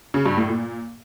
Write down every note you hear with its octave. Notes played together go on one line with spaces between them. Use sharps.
C#3
G2
A2
A#2